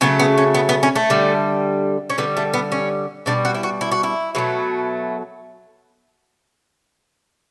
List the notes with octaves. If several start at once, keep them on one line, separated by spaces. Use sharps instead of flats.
C#3 F#3 A3 B3
B3
C#4
B3
B3
C#4
A3
D3 G3
C#4
D3 G3 B3
A3
B3
C#4
B2 G3 D4
F#4
E4
F#4
E4
F#4
E4
B2 F#3 A3